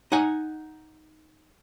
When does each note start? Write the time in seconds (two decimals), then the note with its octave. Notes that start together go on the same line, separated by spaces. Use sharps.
0.12 D#4 F#5 G#5